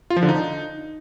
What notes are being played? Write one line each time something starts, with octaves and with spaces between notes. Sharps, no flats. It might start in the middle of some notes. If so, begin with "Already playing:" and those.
F4
F3
D3
D#4